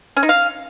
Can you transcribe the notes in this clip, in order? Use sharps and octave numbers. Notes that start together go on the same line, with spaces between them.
C#4
D#4
F5